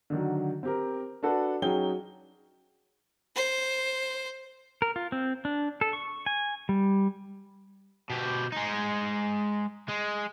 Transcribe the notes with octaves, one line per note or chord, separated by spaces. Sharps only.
D3 D#3 F#3
C4 G4 A#4
D4 F#4 A4 B4
F#3 C#4 D#4 G#4 G5 G7
C5
A#4
F4
C4
D4
A4
C#6
G#5
G3
B2 G4
G#3 D#4
G#3